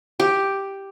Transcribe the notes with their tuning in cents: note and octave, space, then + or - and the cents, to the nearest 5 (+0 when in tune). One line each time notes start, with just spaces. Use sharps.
G4 +0